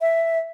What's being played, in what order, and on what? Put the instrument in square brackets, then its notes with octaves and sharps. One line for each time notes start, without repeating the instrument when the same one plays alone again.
[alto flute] E5